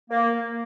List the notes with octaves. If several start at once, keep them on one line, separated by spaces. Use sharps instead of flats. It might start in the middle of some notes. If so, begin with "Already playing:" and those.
A#3